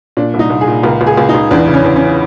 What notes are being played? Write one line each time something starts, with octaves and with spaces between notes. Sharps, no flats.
A#2 D4
C2
D#4
C2
G#4
A#2
C#2 A#4
C#2
G#4
C#2
D#4
C#2
E2 D4
C#3
C#4
E2
C#4